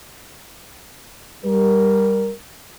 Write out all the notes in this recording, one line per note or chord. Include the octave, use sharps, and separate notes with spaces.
G3 A#4